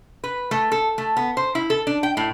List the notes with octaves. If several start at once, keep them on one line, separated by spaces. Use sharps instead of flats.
B4
A3
A4
A3
B3
C5
E4
A4
D4
G5
A2